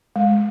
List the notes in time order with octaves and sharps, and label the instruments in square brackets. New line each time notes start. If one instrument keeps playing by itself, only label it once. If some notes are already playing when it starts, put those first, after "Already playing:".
[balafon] G#3